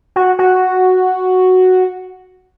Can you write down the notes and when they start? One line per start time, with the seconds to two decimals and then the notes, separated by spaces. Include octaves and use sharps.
0.16 F#4
0.39 F#4